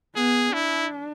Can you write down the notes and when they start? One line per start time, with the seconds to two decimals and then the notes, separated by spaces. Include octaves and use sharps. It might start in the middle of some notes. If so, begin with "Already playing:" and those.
0.16 B3 G#4
0.53 D4 E4